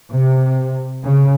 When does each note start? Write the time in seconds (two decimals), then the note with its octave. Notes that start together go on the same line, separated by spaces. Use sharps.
0.11 C3
1.03 C#3